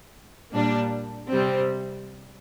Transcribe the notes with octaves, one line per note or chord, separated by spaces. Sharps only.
A#2 G3 A#3 D4
C3 G3 C4